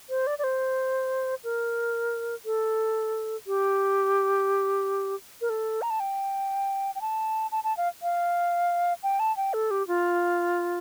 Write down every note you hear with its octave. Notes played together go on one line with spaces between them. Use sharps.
C5
D5
D5
C5
A#4
A4
G4
A#4
A4
A#5
A5
G5
G5
A5
A5
A5
F5
F5
G5
A5
G5
A4
G4
F4